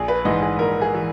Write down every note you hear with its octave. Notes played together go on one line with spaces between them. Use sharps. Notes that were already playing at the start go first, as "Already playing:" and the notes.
Already playing: A#1 G#4
B4
G#2 E3 D#5
G#4
A#1 A#4
G#4
E3